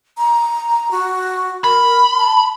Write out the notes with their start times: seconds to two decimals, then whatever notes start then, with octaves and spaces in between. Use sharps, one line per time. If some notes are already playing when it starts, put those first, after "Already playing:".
0.17 A#5
0.91 F#4
1.64 A#4 B5
2.18 A5